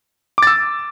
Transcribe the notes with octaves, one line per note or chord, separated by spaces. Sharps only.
D6 E6 A6